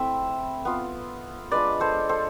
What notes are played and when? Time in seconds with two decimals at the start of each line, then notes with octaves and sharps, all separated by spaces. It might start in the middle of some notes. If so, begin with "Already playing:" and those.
Already playing: A3 C4 E4 E5
0.65 B3 F4
1.51 G#3 D4 F4 B4 D5
1.80 A4 C5
2.09 A4 C5